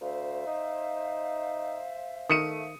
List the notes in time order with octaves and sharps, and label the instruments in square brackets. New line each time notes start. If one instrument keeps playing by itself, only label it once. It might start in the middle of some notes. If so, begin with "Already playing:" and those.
[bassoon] D2 [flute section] C5 E5 F5
[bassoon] D#4
[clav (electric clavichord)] D#3 [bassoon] A3 [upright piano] D#6 C#7 D#7